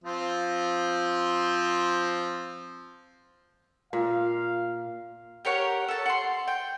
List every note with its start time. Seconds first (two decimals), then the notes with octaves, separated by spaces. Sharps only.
0.04 F3 C4 F4
3.93 A#2 F5
5.45 G4 A#4 C#5 F#5
5.88 A4 A5
6.06 F#5 C6
6.48 G5